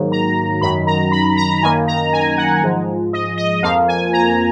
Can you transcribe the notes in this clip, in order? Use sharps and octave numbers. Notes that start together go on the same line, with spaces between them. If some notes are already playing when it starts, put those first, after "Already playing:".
Already playing: G#2 D#3 F#3 A#3
A#5
F#2 D#3 F#3 B5
A#5
B5
A#5
F#2 D#3 A#3 G#5
A#5
G#5
F#5
G#2 F3 G#3
D#5
D#5
F2 F3 A#3 F5
G#5
A#5